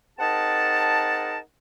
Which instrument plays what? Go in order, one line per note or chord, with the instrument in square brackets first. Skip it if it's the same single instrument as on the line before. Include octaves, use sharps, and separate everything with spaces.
[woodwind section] C4 D#4 G#4 A#4 F#5 A5